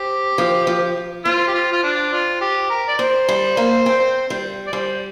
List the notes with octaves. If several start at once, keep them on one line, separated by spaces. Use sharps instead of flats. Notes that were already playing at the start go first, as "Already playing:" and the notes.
Already playing: C4 G4
F3
F3
C4 F4
G4
F4
F4
D4
F4
G4
A#4
D5
C4 C5
G3
A#3
C4
G3
D5
G3 C5